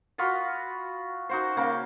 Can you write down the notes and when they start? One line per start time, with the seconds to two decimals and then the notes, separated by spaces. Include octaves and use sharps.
0.18 F4 F#4 D#5 B5
1.29 D#4 F#4 C5
1.56 C#3 A#3 G5 D6